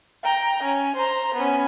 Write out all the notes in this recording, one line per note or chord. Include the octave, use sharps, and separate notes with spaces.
G5 A#5
C#4
C5 A#5
B3 C#4